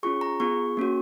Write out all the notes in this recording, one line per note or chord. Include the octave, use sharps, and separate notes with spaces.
C#4 F4 G#4 C#6
A#5
B3 F4 G#4 C#6
A#3 C#4 F#4